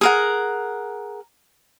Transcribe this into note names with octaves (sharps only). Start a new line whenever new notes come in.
G#4 A#4 F#5